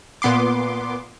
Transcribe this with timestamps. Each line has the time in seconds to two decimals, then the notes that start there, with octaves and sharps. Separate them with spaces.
0.22 A#2 B3 C6 D6